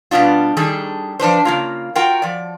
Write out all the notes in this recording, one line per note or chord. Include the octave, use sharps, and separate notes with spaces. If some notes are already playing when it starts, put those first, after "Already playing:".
B2 G3 B3 D4 F4
D#3 G3 D4 G#4 A4
F3 D4 B4 C5
C#3 A#3 F4
F4 F#4 A#4 G5
F3 D5